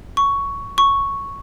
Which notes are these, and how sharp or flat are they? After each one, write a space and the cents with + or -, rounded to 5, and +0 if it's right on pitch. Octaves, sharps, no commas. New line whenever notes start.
C#6 +10
C#6 +0